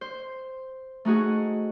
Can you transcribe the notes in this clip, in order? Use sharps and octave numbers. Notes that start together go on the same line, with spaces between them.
C5
A3 D#4 F#4 G#4